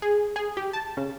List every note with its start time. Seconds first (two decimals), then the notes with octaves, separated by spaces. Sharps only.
0.02 G#4
0.36 G#4
0.57 G4
0.73 A5
0.97 C#3